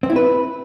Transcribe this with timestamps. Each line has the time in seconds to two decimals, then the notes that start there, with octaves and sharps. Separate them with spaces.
0.03 C4
0.10 E4
0.16 B4